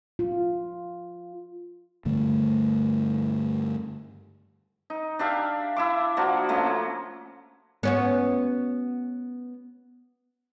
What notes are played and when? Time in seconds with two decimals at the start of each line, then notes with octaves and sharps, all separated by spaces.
0.19 F4
2.05 G2 D3 A3
4.90 D#4
5.19 D4 G4 E5 F5
5.76 E4 E5 D6
6.17 F3 A#3 D4 F#4
6.49 A3 A#3 C#4
7.83 B3 C#4 F#4